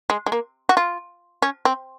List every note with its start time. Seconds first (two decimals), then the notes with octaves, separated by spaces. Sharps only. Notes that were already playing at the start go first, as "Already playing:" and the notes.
0.10 G#3
0.26 G#3
0.32 A#3
0.69 F#4
0.77 F4
1.42 C#4
1.65 C4